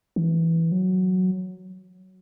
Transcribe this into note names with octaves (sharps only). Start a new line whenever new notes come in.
E3
F#3